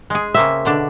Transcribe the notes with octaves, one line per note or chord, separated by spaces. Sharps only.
G#3 G#4
C#3 A#3 C4 E5
B2 D3 D4